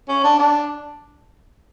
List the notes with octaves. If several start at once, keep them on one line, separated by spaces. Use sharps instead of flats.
C#4
D4
D4